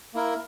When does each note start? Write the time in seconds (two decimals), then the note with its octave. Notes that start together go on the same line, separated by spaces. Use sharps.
0.14 A#3 E4 A#4